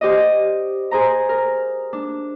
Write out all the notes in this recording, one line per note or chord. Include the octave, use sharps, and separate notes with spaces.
G4 C5 D5 D#5
G#4 C5 A#5
A#4
D4